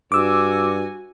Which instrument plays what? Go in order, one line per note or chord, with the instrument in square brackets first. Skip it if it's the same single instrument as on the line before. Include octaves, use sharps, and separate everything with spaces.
[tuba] G2 [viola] F#4 G#5 [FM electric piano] D6 E6